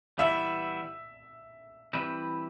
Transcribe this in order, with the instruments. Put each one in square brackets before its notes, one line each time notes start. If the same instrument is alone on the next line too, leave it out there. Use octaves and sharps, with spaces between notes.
[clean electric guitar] E3 G3 B3 E4 [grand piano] E5
[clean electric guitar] E3 G3 C4 E4 B4